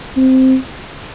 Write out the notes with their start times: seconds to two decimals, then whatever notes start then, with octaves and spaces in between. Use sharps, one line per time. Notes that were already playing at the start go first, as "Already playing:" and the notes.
0.16 C4